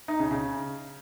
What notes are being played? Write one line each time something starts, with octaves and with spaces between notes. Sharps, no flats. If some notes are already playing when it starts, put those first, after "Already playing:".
D#4
C#3
C#3